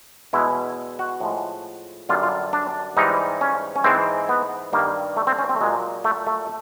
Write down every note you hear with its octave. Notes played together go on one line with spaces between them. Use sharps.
E2 B2 G#3 E4
F#4
A2 F3 G#3
F#2 D3 G3 F4
F4
D4
G#2 E3 G3 D#4
C#4
C#4
G#2 E3 G#3 C4
B3
G2 D#3 G3 A#3
A3
C4
C#4
C4
A3
A#2 F#3 G#3
A3
A3